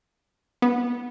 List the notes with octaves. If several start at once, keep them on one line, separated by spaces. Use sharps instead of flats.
B3